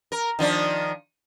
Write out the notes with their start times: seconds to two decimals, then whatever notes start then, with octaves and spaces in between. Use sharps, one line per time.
0.12 A#4
0.39 D#3 F3 D4